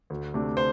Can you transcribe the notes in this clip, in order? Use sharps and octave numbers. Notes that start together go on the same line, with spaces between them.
D2
C3 A3 D4
C5